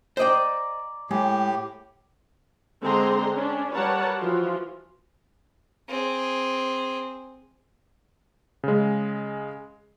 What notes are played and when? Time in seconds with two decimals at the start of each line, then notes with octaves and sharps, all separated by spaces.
0.17 C5 D5 D#5 G5 A#5
1.11 A2 G#3 G4
2.81 D3 G#3 C4 G#4 A#5 C6
3.35 C#4 D4
3.74 G3 A#4 B4 C#5 F#5 A5
4.18 E3 F3 F4 F#4
5.89 C4 G#4
8.64 C#3 G#3